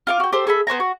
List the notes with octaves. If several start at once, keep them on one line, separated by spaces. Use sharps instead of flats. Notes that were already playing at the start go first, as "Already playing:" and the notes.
F4 F5 D6
F#4 G5
G4 A4 C5
G#4 A4 E5 B5
B3 C5 G#5 A#5
F#4